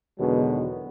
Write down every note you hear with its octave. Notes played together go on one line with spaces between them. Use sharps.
E2 B2 D3 D#3 F#3 G#3